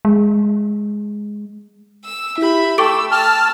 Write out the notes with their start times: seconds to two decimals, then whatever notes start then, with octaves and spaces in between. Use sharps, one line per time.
0.05 G#3
2.05 E6
2.38 E4 G4 E5 B5
2.78 A3 A4 G5 A5 C#6 D6 E6 D7
3.11 G5 A5 E6 F6